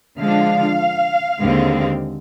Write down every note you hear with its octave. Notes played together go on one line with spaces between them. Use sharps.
D3 F3 G#3 D4 F5
D#2 D3 G#3 C4